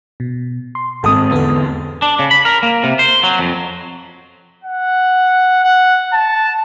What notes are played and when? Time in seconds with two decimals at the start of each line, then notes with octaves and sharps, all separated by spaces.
0.20 B2
0.75 C6
1.04 G#1 G#2 C4 A4 D#6
1.32 E2 D3 B3 A4
2.02 D4
2.19 C#3
2.31 B5
2.45 A#4
2.63 A#3
2.83 C3
2.99 C5
3.23 F#3
3.39 F2
4.64 F#5
5.64 F#5
6.13 A5